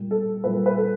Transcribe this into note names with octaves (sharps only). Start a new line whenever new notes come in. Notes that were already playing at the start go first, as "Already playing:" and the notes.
Already playing: A#2 G3
A4
A#2 G3 B4
B4
A4